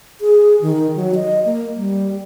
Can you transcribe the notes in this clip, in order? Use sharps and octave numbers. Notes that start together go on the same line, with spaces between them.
G#4
D#3
F#3
D#5
A#3
G3